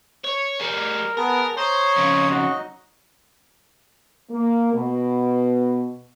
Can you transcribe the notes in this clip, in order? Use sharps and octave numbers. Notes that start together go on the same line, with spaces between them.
C#5
G3 G#4 A#4
B3 G#4 A#4 A5
C5 C#5 A#5 C6 D#6
F2 C#3
F#3 D#4 F#4 D#5
A#3
B2